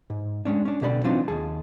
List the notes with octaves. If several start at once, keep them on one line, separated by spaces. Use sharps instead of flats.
G#2
G#3 C#4 D4
C#4 D4
B1 B2 D3 G4 D5 B5
E3 F#3 C4 D4 D#4 F4
D#2 G#4 A5